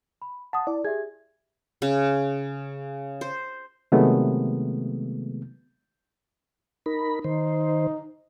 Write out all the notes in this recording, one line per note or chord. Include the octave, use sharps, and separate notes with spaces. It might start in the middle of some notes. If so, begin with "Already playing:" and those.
B5
F#5 A5 D#6
E4 D5
G4 G#4 E5 G#6
C#3
C5
C3 D#3 F#3 G#3 A3 B3
D#4 A#4 B5
D#3 D#4 C5